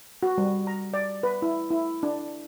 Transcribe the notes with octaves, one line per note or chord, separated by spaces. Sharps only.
F#4
G3
A#5
D5
B4
E4
E4
D4